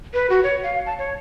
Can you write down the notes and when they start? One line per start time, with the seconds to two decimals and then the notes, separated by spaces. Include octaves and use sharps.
0.14 B4
0.30 F#4
0.43 C#5
0.63 F5
0.86 A5
0.98 C#5